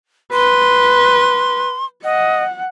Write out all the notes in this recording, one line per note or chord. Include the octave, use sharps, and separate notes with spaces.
B4 C6
D#5 F#5